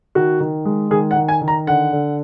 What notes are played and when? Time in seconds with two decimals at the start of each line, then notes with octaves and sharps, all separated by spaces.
0.15 D#3 F#4
0.40 D#3
0.65 G#3
0.91 D#3 G#4
1.11 F#5
1.16 D#3
1.28 G#5
1.41 D#3
1.48 A#5
1.67 D3 F#5
1.92 D3